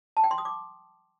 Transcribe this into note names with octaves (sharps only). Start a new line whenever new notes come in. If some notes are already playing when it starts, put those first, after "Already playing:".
A5
G5
C6
D#6
D6